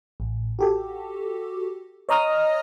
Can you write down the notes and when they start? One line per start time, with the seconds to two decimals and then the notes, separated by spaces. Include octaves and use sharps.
0.20 A1
0.59 F#4 G4 A4
2.09 C#5 D#5 A#5 D#6 F6 A#6